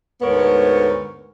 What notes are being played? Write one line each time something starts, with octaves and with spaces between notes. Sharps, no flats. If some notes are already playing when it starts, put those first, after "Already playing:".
D2 G#2 A3 B3 A#4 C#5